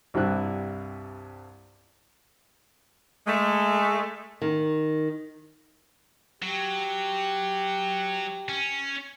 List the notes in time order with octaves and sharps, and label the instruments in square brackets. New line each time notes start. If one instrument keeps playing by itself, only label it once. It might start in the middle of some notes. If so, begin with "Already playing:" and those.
[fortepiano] C2 G2 G3 E4 F#6
[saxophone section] G#3 A3
[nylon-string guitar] D#3
[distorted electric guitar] F#3 [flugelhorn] G4
[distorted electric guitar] C#4